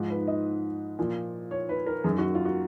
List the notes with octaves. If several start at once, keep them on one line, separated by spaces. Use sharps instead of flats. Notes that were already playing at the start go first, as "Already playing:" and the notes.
Already playing: G#2 F3
B4
D#5
A#2 F3
C#5
B4
A#4
F#2 D#3 G#4
F#4
F4
F#4